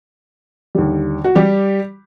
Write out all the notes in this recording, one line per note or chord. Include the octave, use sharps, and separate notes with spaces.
D#2 D3 G3
F#4
G3 G4